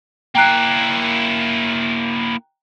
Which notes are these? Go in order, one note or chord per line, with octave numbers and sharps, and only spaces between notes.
A#3 E4 G5 A#5 F#6